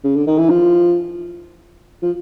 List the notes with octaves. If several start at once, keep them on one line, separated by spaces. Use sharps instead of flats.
C#3
D3
D#3
E3
F3
F3